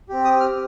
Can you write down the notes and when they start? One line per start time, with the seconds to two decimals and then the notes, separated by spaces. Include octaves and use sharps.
0.09 C4 G4
0.24 D#6
0.40 F6